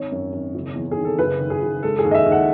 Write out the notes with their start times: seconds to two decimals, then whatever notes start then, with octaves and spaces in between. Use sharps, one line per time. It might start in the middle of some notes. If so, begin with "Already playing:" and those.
Already playing: G#1 C#5
0.12 F#2
0.33 G#1
0.55 F#1
0.75 E2
0.91 G#4
0.97 D#3
1.05 A4
1.19 F#1 B4
1.40 D#3
1.50 G#4
1.62 F#1
1.83 G#3 A4
1.99 G#4
2.05 D#2
2.11 D#5
2.15 E5
2.26 D#2
2.32 F#5